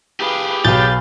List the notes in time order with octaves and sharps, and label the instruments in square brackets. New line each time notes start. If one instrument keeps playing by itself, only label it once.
[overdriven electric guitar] G4 G#4 [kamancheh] B4 F5
[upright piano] B1 [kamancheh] B4 F5 [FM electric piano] G6 A6